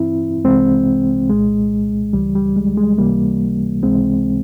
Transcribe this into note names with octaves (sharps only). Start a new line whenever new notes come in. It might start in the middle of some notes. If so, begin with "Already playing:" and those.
Already playing: G2 E3 C4 E4
C2 C3 E3 G#3 C4
C2 A#2 G#3
C#2 C#3 E3 G3
G3
G#3
G#3
C#2 C3 E3 G3 A#3
C#2 C3 E3 G#3 C4